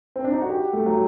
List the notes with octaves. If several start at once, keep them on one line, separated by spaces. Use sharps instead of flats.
C4
D4
D#4
F#4
G4
A3
F#3